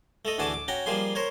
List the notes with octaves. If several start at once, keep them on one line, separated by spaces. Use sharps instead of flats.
A3 A4 D#5
D2 E3 F#4 G#4 A5 D6
D6
C#4 F#4 G5 A#5
F3 G3 A#3 G#4 C6
A#4 C5 C#5